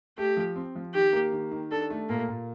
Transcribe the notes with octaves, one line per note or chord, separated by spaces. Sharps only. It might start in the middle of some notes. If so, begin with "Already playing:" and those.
A3 G4
F3
C4
F3
D#3 G4
A#3
D#3
D#3
D4 A4
A3
A#2 A#3
A#2